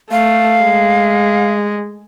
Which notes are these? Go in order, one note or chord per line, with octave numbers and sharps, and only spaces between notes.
A3 F5
G#3